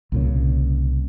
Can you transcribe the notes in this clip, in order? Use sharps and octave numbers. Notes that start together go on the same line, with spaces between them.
C2 A#2 C#3